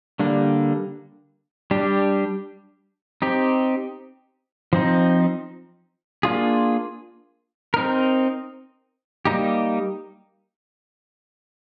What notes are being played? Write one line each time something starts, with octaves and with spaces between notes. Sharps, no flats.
D3 G3 A#3 D4
G3 D4 G4
C4 D#4 G4
F3 C4 D#4
A#3 D4 F4 G#4
C4 D#4 A#4
G3 A#3 D#4 G4